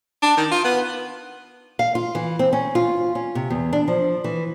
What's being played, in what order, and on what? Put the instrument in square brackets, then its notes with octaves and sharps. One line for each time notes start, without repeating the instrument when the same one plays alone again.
[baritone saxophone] D4
D#3
F4
B3
[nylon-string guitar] F5
F4
E3
C4
C#4
F4
C#4
C3
E2
D4
F3
E3